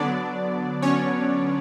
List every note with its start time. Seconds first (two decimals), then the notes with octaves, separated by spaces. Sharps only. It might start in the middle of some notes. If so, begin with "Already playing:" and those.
Already playing: D3 F#3 B3 D4 D5
0.82 C#4 C#5